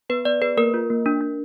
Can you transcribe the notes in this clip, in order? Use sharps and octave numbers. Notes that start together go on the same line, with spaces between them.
B3 B4
B3 D5
G#4 B4
A#3 A#4
F4
A#3
D4
D4